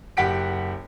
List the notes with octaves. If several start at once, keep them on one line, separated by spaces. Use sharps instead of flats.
F#1 G4 F#5 B6 D7